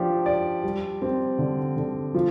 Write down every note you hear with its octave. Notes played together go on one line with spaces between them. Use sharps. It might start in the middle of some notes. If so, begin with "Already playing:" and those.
Already playing: F3 D4 G4
D5
G3
C4
D3
D3
F3